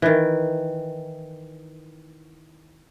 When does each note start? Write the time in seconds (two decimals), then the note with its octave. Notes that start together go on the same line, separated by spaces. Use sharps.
0.02 D#3 E3